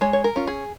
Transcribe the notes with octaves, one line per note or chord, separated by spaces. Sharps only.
G#3 C#5
C#5
A#4
C#4 F4
G#4